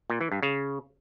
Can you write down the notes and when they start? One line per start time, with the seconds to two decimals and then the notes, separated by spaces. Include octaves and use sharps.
0.10 A#2
0.21 E3
0.32 G2
0.43 C#3